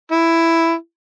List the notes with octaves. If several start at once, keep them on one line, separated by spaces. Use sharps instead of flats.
E4